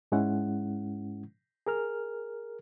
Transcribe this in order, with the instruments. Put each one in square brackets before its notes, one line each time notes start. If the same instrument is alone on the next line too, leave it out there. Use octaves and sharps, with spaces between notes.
[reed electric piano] G#2 G#3 C#4 E4 F#5
G#4 A#4 F6